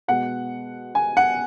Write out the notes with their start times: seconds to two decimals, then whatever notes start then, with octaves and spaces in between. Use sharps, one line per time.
0.08 B2 G#3 F#5
0.95 G#5
1.17 F#5